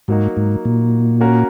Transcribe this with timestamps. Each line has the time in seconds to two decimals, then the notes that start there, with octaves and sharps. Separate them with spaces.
0.08 G#2 F#3 A#3 D#4 F#4
0.37 G#2
0.65 A#2
1.20 A#3 C#4 F#4 A#4